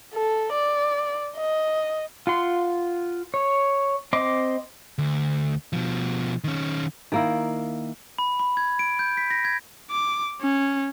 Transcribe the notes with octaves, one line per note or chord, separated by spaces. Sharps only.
A4
D5
D#5
F4 F#5 C6
C#5
C4 D#5 C6 D6
D2
B2 F3
D#3 C#4
D#3 A#3 E4
B5
B5
G#6
D7
G6
B6
A#6
G#6
D6
C#4